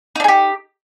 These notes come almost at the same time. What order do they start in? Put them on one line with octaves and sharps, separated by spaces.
D#4 D4 G#4 G4